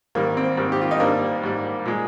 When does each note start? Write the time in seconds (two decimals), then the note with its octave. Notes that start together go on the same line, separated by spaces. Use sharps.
0.15 G#2 D#3 G3 A#3
0.37 C4
0.57 G#2 D#3 G3
0.72 G4
0.81 F4
0.91 D#4
1.00 G#2 G3 A#3 D4
1.43 G#2 G3
1.86 A#2 G#3